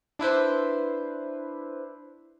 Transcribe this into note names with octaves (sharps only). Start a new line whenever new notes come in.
D4 E4 B4 C5